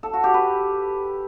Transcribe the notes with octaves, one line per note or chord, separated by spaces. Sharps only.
A4
F#4
G4
B4